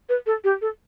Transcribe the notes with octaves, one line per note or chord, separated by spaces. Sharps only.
B4
A4
G4
A4